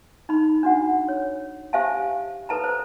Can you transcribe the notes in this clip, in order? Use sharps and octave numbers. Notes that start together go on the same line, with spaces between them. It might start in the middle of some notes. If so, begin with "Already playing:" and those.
D#4 B5
D4 F#4 F#5
C#5
G4 C5 E5 F5 G#5 A5
A4 B4 A5 A#5
C5